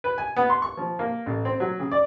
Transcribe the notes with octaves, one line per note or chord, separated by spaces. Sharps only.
B4
G#5
B3
C6
C#6
F3
A#3
A1
C4
F#3
C#3
D5